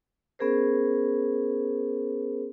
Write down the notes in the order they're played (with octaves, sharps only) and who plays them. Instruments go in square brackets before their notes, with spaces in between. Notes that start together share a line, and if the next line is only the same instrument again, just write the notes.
[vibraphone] B3 C#4 G#4 A#4 C5